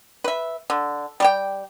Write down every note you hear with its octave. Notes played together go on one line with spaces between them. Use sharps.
B4 E5
D3
G3 G4 G5